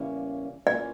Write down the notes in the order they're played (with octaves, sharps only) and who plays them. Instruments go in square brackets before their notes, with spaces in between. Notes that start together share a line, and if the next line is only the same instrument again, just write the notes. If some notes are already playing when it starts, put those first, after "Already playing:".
Already playing: [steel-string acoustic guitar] E2 C#3 G3 A#3 C#4
[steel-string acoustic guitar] E3 A#3 C#4 F4 [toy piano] D5